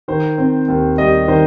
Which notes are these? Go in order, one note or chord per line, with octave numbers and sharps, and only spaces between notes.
D#3 C5
C4
D#2
G3 D#5
D#3 C5